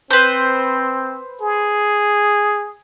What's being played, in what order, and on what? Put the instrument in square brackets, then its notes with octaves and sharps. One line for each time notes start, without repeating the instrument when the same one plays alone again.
[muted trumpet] C4 [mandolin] B4 C5
[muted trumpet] G#4